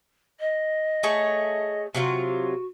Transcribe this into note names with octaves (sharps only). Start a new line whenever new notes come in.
D#5
A3 G#4 C#5
C3 F#3 F4 F#4